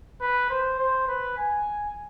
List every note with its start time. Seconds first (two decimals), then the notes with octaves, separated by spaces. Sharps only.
0.21 B4
0.50 C5
0.79 C5
1.07 B4
1.37 G#5